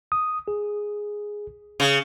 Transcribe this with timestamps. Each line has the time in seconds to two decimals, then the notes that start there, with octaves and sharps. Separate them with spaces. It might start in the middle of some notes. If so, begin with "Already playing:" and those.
0.12 D#6
0.48 G#4
1.80 C#3